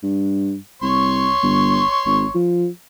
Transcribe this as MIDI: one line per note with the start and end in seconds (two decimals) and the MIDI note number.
0.03 0.56 43
0.82 1.33 36
0.82 2.36 73
0.82 2.36 84
0.82 2.36 85
1.43 1.82 31
2.06 2.25 32
2.35 2.67 53